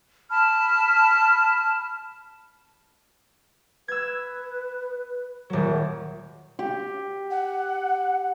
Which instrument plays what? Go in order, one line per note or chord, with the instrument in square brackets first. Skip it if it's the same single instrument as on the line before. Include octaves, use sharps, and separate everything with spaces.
[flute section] A5 B5 F6
[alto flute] B4 [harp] E6 G#6
[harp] D#1 F#3 [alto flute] A#4
[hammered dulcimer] G4
[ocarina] F#5